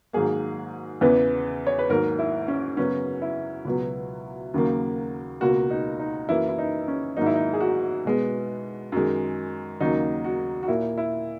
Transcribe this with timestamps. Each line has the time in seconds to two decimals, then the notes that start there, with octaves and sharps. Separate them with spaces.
0.13 G#2 D#3 F#3 A#3 G#4
1.01 E2 C#3 E3 B3
1.67 C#5
1.79 B4
1.89 G#2 D#3 F#3 A#3 A#4
2.19 E4
2.48 C#4
2.77 F#2 C#3 F#3 B3 C#4
3.22 E4
3.65 C#2 B2 F#3 B3
4.54 D#2 C#3 F#3 A#3
5.41 C#2 B2 A#3 F#4
5.70 D#4
5.99 D#4
6.29 F#2 E3 A#3 E4
6.48 E4
6.58 D#4
6.88 C#4
7.17 G#2 D#3 F#3 A#3 D#4
7.26 E4
7.35 D#4
7.54 G#4
7.60 F#4
8.05 B2 G#3 B3
8.92 F#2 D#3 G#3
9.80 D#2 C#3 F#3 A#3 D#4
10.24 F#4
10.63 F#4
10.68 A#2 A#3 E4
10.98 E4